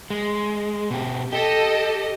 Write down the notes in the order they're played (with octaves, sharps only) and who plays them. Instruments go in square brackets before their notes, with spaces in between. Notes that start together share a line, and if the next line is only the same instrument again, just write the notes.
[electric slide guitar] G#3
B2 G4
[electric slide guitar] G4 [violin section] A4 D#5